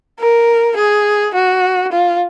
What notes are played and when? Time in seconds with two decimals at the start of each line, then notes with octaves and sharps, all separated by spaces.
0.19 A#4
0.77 G#4
1.34 F#4
1.92 F4